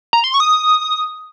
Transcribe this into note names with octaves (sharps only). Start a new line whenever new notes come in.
A#5
C6
C#6
D#6